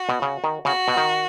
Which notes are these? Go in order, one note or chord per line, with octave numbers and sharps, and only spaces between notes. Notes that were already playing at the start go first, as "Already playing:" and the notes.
Already playing: F#4
B2
C#3
D#3
C#3 F#4
B2
D#3